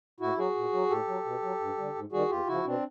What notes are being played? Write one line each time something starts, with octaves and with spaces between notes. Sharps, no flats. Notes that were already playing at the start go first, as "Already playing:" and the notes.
A2 E4 F#4
F#3 F#4 G#4
A#2
F#3
A2 G4 A4
F#3
B2
F#3
G2
D3 G3
G#2
D#3 G3 F#4 G#4
E2 F4 G4
C#3 F3 E4 F#4
B2 C4 D4